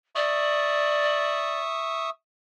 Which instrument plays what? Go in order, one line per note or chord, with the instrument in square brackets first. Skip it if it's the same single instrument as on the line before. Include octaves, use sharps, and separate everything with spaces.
[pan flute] D5 [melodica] E5 C#6 D#6